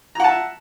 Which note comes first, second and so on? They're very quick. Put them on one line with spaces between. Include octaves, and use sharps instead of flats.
A#5 F#5 A5 E5